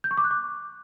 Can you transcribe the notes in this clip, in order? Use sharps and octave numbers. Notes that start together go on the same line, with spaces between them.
G6
C#6
D6
F#6
D6